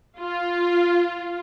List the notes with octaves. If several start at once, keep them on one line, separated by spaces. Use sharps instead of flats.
F4